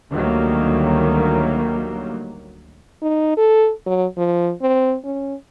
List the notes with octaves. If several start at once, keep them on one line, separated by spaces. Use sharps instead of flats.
D2 D#3 F#3 G3 A#3
D#4
A4
F#3
F3
C4
C#4